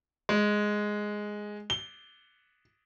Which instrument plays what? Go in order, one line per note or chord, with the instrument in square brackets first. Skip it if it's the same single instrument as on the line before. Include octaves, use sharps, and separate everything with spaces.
[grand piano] G#3
G7